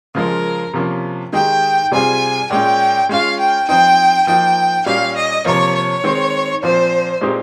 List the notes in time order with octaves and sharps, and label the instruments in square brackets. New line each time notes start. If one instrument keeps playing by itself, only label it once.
[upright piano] C#3 F3 G#3 [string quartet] A#4
[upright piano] C3 F3 A#3 C#4
[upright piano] D#3 G#3 D#4 G4 [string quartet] G5
[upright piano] C3 G3 C4 F4 G#4 [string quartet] G#5
[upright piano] A#2 G#3 C#4 [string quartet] G5
[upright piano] G#3 C#4 F4 [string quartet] F5
[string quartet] G5
[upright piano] F3 C4 D#4 [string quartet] G5
[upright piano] F3 A#3 D#4 [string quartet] G5
[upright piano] A#2 G3 C#4 G4 [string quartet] F5
[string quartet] D#5
[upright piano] C3 F3 A#3 [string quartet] C#5
[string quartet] C#5
[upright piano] D#3 G#3 C4
[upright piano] A#2 F3 C4 [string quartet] C5
[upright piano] A#2 G#3 C4 D#4 G4